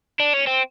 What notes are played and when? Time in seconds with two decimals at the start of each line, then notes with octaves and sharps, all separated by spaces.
0.20 D4
0.33 C#4
0.47 C4